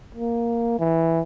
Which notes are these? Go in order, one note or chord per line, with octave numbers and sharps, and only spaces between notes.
A#3
E3